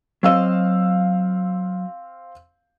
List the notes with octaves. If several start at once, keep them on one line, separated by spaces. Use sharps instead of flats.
F#3 C4 D#5 F5 E6